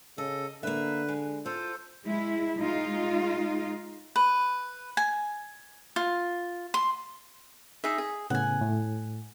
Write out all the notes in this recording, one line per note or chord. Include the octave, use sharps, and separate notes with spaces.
C#3 A4 D#5
D3 A#3 B4 E5
G#3
F4 A4 C5
G#3 E4
G#3 D#4 F4
B4
G#5
F4
C6
D#4 G#4 E5
G#4
A2 C#3 B3 F#5 G#5
A2